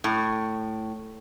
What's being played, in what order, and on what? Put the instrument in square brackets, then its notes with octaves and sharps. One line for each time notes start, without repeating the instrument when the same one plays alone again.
[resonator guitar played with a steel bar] A2